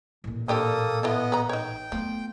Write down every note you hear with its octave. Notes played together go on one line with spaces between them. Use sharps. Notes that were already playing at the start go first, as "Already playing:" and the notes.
A1 A#2
A#3 C4 D4 G4 A4 D#6
B3 E4 F4 A4 D#5
B4 A#5
D#4 C#5 G5
F3 A3 B3